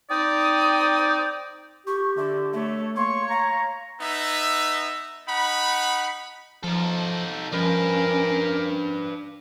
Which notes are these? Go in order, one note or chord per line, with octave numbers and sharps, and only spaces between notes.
C4 D#4 D5 G5 D#6
G4 C#6
D3 E5
A3 C#5 E5
A#3 C#5 C6 C#6
F5 A#5
B3 D#4 E5
D#4 F#5 B5
F3 D#4 A4
F3 C#4 D4 A#4 B4